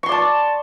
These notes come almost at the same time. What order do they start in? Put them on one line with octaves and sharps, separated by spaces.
C#6 C6 D5 A5